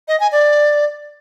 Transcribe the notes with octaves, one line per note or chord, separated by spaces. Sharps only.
D#5
G#5
D5